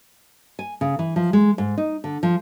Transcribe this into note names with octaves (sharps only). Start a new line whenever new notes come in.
G#5
C#3
E3
F3
G#3
G#2
D#4
D3
F3